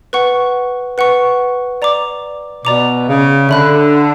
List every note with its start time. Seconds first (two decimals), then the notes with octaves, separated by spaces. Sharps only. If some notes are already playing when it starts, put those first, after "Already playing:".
0.13 B4 F#5 C#6
0.98 B4 F#5 C#6
1.82 D5 A#5 D6
2.64 B2 D5 A#5 D6
3.07 C#3
3.49 D3 E5 B5 F#6